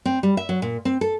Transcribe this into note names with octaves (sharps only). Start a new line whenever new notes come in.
C4
G3
E5
F#3
A#2
C4
A4